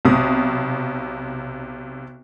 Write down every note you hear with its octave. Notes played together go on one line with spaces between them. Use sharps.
B1 C3 D#6